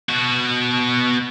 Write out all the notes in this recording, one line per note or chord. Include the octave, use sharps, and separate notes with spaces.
B2 F#4